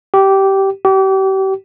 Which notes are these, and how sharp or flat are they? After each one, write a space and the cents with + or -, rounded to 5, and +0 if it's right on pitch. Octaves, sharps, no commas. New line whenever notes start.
G4 -15
G4 -35